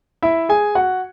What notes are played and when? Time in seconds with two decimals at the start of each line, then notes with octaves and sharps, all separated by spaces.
0.22 E4 E5
0.49 G#4 G#5
0.75 F#4 F#5